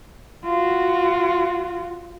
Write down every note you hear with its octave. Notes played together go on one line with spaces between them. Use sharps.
F4 F#4